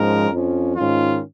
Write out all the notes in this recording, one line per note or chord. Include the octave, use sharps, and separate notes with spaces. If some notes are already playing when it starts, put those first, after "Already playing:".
Already playing: G#2 F3 G#3 C#4 A#4
F2 F3 C#4
G#2 D#3 C#4 F4